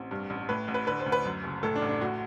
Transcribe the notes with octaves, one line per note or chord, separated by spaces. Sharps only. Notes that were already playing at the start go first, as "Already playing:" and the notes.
Already playing: A1 C4
G2
A1
A2 B4
A1
B4
D3 B4
C5
D2
B4
F#2
F#1
A2 A4
D4
A1
D4
A2 F#4